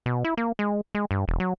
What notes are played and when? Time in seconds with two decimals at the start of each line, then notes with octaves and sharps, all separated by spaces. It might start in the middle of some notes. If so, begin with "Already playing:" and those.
0.06 B2
0.24 E4
0.37 A#3
0.59 G#3
0.95 G#3
1.11 G2
1.28 E1
1.40 F#3